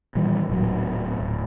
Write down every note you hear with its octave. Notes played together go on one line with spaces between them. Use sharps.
A#2 D#3 E3 G3
D1 A#2 F#3
D1